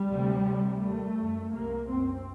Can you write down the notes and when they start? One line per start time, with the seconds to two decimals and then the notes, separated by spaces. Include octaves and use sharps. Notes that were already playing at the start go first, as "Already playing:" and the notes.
Already playing: G3
0.10 D2 C3
0.46 D2 C3
0.81 D#2 A3
1.18 F#2
1.53 C2 C3 A#3
1.90 F#2 C4